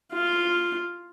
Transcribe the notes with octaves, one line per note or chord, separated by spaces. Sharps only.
F4